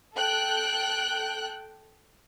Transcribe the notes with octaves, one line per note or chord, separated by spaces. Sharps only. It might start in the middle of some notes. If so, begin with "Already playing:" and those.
A4 G5 F#6